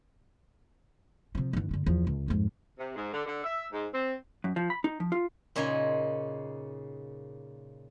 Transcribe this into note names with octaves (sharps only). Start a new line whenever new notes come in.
C3 F3
G2 E3
G2 D3
E2 F3
C#2
F2 G#2
C3
G#2
D3
D3
E5
G#2
C4
F#2
F3
B5
D#4
F3
F4
A#2 C#3 D#4 G#5 A#5 C6